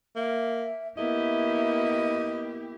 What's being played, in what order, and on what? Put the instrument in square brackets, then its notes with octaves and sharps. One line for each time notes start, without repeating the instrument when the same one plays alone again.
[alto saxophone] A#3 [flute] E5
[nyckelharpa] A#3 B3 [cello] E4 G4 [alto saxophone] D#5 [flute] E5